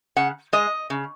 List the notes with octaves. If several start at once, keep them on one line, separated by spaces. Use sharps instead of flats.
C#3 F#5
G#3 D#5
C#3